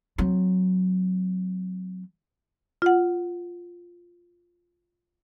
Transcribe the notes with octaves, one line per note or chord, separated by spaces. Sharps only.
F#3 C4
F4 F#5